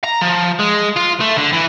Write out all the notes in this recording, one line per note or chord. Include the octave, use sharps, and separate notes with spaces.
A#5
F3
G#3
F4
A3
D3
E3